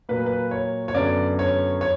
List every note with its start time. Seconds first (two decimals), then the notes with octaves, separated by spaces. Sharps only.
0.09 A#2 F#3 A#3 B4
0.26 B4
0.51 C#5
0.88 C#5
0.95 F#2 D3 F#3 B3 D5
1.39 C#5
1.81 C#5